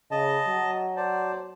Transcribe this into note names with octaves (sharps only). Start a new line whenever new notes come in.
C#3 D#5 A5
F#3
C5 D5 A5